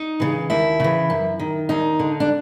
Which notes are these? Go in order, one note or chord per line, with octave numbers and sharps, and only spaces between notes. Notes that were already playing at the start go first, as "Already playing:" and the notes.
Already playing: D#4
C#3 E3
D#2 E4
C#3 E3
F#2
D#3
D#2 D#4
D3
D4